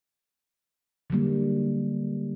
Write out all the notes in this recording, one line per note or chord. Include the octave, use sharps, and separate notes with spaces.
D3 F#3 G3 A#3